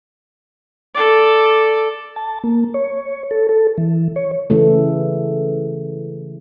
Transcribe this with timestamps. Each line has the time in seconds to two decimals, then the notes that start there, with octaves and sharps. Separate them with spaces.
0.95 A4 D5
2.16 A5
2.44 A#3
2.74 C#5
3.31 A4
3.49 A4
3.78 E3
4.16 C#5
4.50 C#3 E3 A3